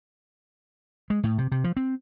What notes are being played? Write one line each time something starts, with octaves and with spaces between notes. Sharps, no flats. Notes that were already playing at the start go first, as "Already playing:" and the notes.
G#3
A2
C3
C3
F3
C4